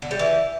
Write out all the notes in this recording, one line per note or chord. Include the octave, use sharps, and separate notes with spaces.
D3
G3
E3